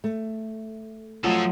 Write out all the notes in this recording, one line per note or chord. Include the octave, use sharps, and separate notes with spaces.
A3
F3 F#3 A3 F4 A4 D#5